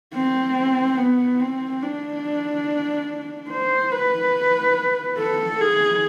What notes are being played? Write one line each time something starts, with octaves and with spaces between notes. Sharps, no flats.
C4
B3
C4
D4
C5
B4
A4
G#4